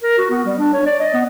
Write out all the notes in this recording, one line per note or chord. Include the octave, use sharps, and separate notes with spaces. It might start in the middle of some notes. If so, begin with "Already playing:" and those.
A#4
F#4
B3
G3
D4
C#5
D5
D#5
B3